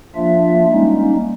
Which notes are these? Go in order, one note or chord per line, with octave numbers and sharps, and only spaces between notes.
F3 A#3 D4 F4 E5
G3 G#3 A#3 C#4 D#4